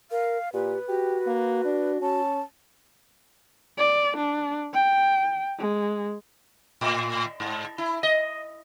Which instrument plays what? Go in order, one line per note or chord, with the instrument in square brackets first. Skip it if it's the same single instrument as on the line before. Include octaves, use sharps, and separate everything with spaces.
[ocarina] A#4 [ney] F5
[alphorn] A#2 [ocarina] G4 [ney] B4
[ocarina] F#4 [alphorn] G4
[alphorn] A#3
D4
[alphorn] C#4 [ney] A5
[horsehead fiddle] D5
D4
G5
G#3
[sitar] A2
G#2
E4
D#5